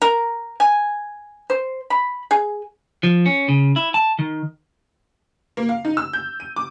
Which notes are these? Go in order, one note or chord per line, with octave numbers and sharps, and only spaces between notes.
A#4
G#5
C5
B5
G#4
F3
C#4
C#3
E4
A5
D#3
A#3
F5
D#4
E6
G6
D#7
D6